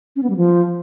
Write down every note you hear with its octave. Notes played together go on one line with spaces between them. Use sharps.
C#4
B3
G3
F3